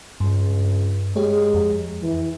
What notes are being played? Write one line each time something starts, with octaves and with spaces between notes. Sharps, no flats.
C#2 G2
G#3 G4 C#5
F2
E3